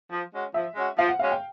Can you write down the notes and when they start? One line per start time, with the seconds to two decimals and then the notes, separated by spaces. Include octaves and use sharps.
0.10 F3
0.32 G#3 C#4 F#4
0.54 F3 E5
0.76 G#3 C#4 F#4
0.98 F3 F5
1.08 F#5
1.19 G#3 C#4 F#4 F5
1.32 G5